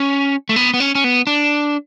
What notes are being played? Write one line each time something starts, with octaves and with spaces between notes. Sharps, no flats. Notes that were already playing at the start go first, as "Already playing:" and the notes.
Already playing: C#4
A3
B3
B3
C#4
C#4
B3
D4